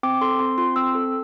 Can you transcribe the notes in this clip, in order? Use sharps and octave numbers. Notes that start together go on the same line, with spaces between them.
C4 D6
A4 C6
C4 C6
F4 C6
C4 E6
A4